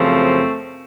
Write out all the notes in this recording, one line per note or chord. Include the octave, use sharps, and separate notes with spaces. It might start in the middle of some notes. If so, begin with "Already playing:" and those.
Already playing: F#2 C#3 F3 A3 C4